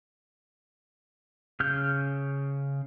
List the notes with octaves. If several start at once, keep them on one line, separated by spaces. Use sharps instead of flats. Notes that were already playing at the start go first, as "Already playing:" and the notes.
C#3 F6 G6